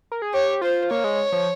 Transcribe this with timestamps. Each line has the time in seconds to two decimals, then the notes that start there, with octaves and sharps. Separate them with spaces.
0.12 A#4
0.22 G#4
0.33 G4 C#5
0.62 F4 C5
0.90 A#3 C#5
1.04 G#3
1.32 F3